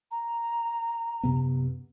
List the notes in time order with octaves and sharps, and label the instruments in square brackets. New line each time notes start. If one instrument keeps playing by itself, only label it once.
[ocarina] A#5
[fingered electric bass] F#2 C3 B3